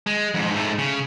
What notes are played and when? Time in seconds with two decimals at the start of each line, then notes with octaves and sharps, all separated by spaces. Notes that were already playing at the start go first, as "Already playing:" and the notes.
0.06 G#3
0.34 F2 G#2
0.52 G#2 A3
0.78 C#3